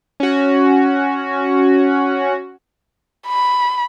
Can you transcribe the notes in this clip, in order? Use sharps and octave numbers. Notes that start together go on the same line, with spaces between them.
C#4 F#4
B5